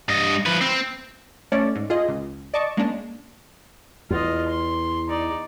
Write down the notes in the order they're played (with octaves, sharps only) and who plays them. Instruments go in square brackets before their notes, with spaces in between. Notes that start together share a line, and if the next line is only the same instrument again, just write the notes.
[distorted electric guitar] G2 D#5
F3 B4
C4
[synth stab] A3 C#4 C#5 D5
G#2
F4 G#4 D#5
C#2
D5 D#5 A5 C#6 D6
G#3 A#3 C#4 D4
[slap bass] E2 [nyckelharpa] F4 D#5
[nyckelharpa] C6
D#4 D5